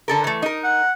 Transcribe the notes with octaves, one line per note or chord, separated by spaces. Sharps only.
D3 A4 A#4
E3 A3
D#4 A#4
F#5